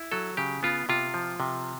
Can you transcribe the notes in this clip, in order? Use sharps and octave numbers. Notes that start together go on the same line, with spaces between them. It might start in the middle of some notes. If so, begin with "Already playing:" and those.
Already playing: E4
F#3 A4
C#3 G4
B3 F4
C3 F4
F3
C3